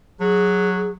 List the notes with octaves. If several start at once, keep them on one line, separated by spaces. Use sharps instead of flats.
F#3 G#4